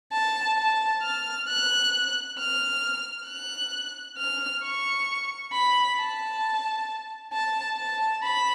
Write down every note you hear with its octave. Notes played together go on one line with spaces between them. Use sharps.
A5
A5
F6
F#6
F6
F#6
F6
C#6
B5
A5
A5
A5
B5